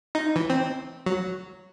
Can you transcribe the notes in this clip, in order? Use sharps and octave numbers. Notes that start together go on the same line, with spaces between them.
D#4
E3
C4
F#3